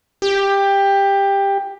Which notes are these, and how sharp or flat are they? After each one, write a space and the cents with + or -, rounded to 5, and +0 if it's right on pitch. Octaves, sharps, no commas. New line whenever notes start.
G4 +15